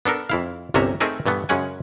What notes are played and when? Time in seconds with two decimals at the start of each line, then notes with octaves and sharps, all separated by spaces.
0.05 B3 D4 A4 A#4
0.30 F2 E4 F5
0.74 G1 C2 C3 C#4 E5 A#5
1.00 A3 C4 D#4 G#4 A#4 E5
1.26 G2 E3 A3 B3
1.49 F#2 C#3 G#3 C#4 F#5 G#5